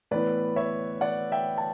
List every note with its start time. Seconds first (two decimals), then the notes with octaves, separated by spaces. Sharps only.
0.11 A2 E3 B3 B4 D5
0.56 C#5 E5
1.01 D5 F#5
1.32 E5 G5
1.58 A5